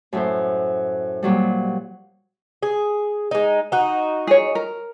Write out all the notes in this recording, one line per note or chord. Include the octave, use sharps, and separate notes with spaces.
F#2 A2 C5
A#2 F#3 G3
G#4
G#3 D#4
D#4 F#4
G#4 C#5
A#4